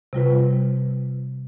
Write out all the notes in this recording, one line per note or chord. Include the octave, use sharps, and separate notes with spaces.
C3 G3 F4 B4